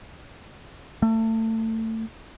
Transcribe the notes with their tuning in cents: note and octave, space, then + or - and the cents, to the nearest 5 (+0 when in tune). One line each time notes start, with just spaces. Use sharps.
A3 +25